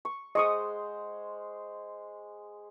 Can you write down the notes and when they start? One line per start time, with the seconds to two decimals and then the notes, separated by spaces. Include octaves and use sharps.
0.05 C#6
0.35 G#3 C5 D#5 F#5 C#6 D#6